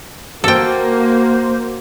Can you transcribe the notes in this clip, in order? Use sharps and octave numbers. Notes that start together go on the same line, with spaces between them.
A#3 F#4 A4 C5 G5